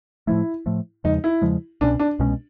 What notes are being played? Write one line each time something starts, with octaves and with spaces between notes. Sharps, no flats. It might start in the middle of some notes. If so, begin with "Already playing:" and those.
A2 F3 A3 E4
A2 F3 A3
E2 C#3 F3 G#3 D#4
E4
E2 C#3 F3 G#3
C2 B2 G#3 C#4 D4
D4
C2 B2 G#3 C#4